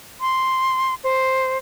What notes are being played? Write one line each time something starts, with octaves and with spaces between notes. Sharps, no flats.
C6
C5